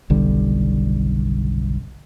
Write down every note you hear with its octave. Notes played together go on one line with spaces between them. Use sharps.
F#1 B1 D3 G3